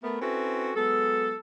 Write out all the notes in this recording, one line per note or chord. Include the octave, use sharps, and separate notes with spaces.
A3 B3 A#4
C4 C#4 E4 F#4 A4 B4
F#3 G#3 B3 A4